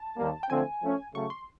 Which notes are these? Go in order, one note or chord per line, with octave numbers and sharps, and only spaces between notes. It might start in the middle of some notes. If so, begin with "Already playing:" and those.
Already playing: A5
D#2 D#3 G3 A#3
G5
D3 F3 A3 C4 G#5
F3 A3 C#4
C#3 F#3 A3 C#6
C6